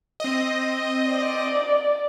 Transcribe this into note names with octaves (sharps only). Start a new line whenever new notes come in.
C4 D#5
D5